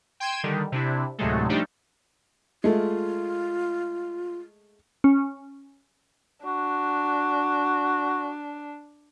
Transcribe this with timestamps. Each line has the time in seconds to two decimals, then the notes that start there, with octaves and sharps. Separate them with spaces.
0.20 G5 C6 G#6 D#7 E7
0.44 D3 D#3 G3
0.72 C3 D4 E4
1.18 D2 A2 C3 F#3 G#3 A3
1.49 F3 G3 A3 D4 D#4 G4
2.64 G#3 A3 F4
5.04 C#4
6.45 D4 F#4